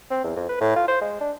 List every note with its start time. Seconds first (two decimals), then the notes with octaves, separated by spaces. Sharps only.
0.10 C4
0.24 E2
0.36 F2
0.49 B4
0.61 A2
0.76 F4
0.88 C5
1.01 G#3
1.21 D4